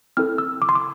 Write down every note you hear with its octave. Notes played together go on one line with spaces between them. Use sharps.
C4 E4 A4 F6
E6
D6
C6
D6